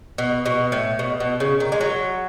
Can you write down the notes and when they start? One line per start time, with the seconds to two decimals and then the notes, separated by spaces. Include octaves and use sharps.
0.18 B2
0.46 B2
0.72 A2
0.99 B2
1.20 B2
1.40 C#3
1.60 D#3
1.72 G#3
1.81 F#3